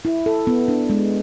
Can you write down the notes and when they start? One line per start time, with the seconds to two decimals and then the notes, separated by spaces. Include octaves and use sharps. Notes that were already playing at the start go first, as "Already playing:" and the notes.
0.05 E4
0.26 A4
0.47 B3
0.68 D4
0.90 G#3